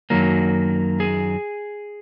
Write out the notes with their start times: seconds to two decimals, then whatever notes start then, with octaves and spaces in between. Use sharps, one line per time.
0.10 F#2 D#3 F#3 A#3
1.00 G#4